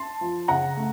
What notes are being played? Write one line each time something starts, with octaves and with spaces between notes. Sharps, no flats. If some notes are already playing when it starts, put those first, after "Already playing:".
Already playing: A5 C6
F3
C#3 F#5 A#5
A3